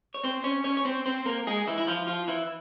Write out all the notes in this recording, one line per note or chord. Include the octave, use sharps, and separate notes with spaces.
C#5
C4 C5
C#4 C#5
C#4 C#5
C#5
C4 C5
C4 C5
A#3 A#4
G#3 G#4
E3 E4
E4
F3 F4
F3 F4
E3 E4